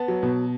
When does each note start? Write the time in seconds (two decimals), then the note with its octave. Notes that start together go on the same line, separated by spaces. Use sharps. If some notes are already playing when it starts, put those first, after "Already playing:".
Already playing: B3 A5
0.08 F#3
0.23 B2